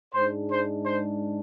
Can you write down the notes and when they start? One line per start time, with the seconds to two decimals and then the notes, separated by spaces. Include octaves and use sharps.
0.13 G#2 G#3 D4 C5
0.48 C5
0.84 C5